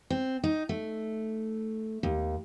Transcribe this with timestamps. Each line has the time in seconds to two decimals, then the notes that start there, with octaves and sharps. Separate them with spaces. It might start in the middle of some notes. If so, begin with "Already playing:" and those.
0.10 C4
0.43 D#4
0.69 A3
2.03 D#2